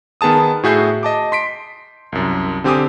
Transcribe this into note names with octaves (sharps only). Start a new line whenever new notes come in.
D#3 B3 G#4 A5 D#6
A2 F#4 G#4 E5 G6 C7
D#5 A5 D6
C6 B6 D7
C2 F#2
D3 C4 G4 G#5 D6 D#6